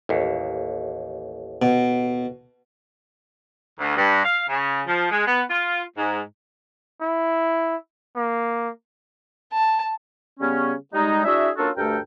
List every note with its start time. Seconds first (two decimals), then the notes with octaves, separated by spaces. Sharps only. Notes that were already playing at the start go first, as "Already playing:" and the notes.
0.09 A1 D#2
1.62 B2
3.79 D2
3.97 G2
4.24 F5
4.49 C#3
4.87 F3
5.11 G#3
5.27 B3
5.50 F4
5.97 G#2
7.01 E4
8.16 A#3
9.53 A5
10.40 C#3 G3 B3 C#4
10.94 G3 G#3 D#4
11.25 D4 E4 F#4 G#4 E5
11.58 A#3 C#4 D4 F4 F#4 A4
11.77 D2 G2 A3 A4 A#4 G5